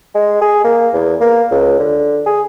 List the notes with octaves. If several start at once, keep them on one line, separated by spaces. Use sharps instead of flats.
G#3
G#4
A#3
E2
A#3
C#2
D3
G#4